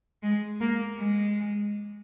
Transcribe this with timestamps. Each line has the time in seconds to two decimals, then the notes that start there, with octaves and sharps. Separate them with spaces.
0.23 G#3
0.61 A#3
0.98 G#3